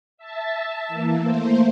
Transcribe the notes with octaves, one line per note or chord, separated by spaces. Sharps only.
E5 A5
E3 A#3
A3 A#3 C5